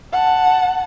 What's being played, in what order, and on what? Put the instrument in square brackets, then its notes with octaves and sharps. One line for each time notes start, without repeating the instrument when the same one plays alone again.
[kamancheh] F#5 A5